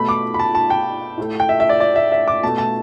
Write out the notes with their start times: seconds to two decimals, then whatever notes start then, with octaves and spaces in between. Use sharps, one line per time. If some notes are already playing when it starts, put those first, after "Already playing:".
Already playing: B2 A3 B5
0.09 D6
0.34 B5
0.39 A5
0.55 A5
0.70 G5
1.18 A2 A3
1.40 G5
1.49 E5
1.60 E5
1.69 D5
1.80 D5
1.96 E5
2.12 E5
2.28 D6
2.43 B2 A3 A5
2.58 A5